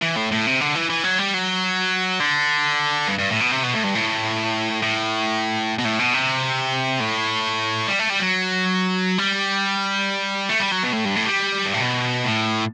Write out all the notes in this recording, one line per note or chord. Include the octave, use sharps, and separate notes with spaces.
E3
A2
A2
C3
D3
E3
E3
F#3
G3
F#3
D3
G2
G2
A2
B2
C3
B2
A2
G2
A2
A2
B2
A2
B2
C3
A2
G3
A3
G3
F#3
G3
A3
G3
F#3
B2
A2
G2
A2
G3
G2
A2
B2
A2